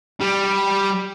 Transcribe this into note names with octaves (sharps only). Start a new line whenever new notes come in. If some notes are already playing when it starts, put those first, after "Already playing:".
G3